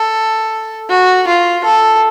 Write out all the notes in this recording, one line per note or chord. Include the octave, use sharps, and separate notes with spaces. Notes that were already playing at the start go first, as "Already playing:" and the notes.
Already playing: A4
F#4
F4
A4